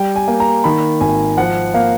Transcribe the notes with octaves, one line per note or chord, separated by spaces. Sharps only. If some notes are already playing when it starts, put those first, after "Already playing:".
Already playing: G3 G5
G#5
A#3
A#5
D#3 B5
G#1 G#5
F3 F#5
A#3 F5